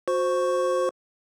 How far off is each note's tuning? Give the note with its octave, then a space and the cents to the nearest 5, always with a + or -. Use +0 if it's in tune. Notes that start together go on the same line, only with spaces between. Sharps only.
F#4 -30 C5 +0 C#6 +0